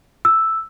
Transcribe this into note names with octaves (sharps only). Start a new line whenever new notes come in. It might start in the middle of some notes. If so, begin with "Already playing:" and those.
E6